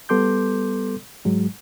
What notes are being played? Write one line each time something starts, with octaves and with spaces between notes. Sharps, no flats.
G3 B3 A4 C6 D6 G6
G#2 F#3 G#3